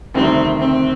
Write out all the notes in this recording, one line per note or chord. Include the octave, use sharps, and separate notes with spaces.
D2 C3 D#3 G3 C4
C4